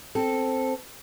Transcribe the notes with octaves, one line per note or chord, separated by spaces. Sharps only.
C4 A4